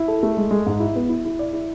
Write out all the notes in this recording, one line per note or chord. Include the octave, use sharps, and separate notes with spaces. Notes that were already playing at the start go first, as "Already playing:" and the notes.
Already playing: E4
A4
A3
G#3
G#3
G#2
E4
B3
E4
E4
D5
E4